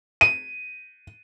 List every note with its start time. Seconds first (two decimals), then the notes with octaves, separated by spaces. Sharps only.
0.21 D#7